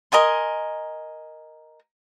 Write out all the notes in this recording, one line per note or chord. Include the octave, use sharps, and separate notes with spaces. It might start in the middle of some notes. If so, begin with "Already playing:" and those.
A#4 D#5 G#5 C6